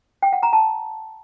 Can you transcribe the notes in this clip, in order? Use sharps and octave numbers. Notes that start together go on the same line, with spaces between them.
G5
F#5
A#5
A5